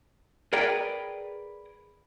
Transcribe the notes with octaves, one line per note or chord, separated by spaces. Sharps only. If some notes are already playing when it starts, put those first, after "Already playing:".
G#4 A#4 B4 D5 G5